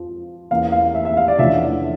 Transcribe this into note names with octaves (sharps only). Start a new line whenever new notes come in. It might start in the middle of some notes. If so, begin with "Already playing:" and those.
Already playing: F2 F3
E2 E3 A#3 C#4 F5
F5
E5
E5
F5
D5
E2 D3 F3 A3 C#4 E5